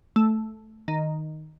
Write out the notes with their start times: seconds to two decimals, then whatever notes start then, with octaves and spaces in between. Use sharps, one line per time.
0.16 A3
0.88 D#3